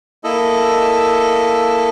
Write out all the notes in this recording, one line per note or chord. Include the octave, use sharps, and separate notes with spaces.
A#3 E4 A4 D#5